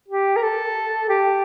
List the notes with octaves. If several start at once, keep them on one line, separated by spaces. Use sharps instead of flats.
G4
A#4
A4
G4